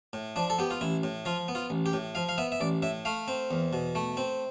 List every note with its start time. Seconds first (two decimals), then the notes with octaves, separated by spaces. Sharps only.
0.13 A2
0.36 F3 D4
0.50 A4
0.58 B3 G4
0.71 F4
0.81 A1 E4
1.03 A2
1.25 F3 F4
1.48 B3
1.55 F4
1.70 A1
1.86 G4
1.93 A2
2.15 F3 F5
2.29 F5
2.38 B3 E5
2.52 E5
2.60 A1 D5
2.82 A2 E5
3.05 A3 F5
3.28 C4
3.51 E2
3.73 B2
3.95 A3
4.17 C4